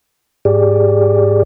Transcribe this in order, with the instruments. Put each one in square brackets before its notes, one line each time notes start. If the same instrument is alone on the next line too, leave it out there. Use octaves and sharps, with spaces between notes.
[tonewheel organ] G#2 G4 G#4 D5